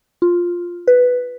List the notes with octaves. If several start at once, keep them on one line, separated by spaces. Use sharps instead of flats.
F4
B4